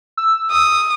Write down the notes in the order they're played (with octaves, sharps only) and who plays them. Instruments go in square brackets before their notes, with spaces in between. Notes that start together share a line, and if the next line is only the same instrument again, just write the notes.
[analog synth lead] E6
[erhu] D#6